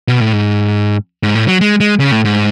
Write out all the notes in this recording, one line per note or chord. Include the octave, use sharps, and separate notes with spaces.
B2
A2
G#2
G#2
A2
F#3
G#3
G#3
C#3
A2
G#2